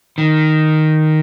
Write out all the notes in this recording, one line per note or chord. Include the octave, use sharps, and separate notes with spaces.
D#3